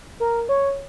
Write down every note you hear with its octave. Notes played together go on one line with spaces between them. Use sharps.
A#4
C#5